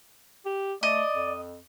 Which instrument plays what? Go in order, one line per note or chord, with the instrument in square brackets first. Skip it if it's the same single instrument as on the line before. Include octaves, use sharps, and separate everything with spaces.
[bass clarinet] G4
[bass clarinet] A3 [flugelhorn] D5 [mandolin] D#5
[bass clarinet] F2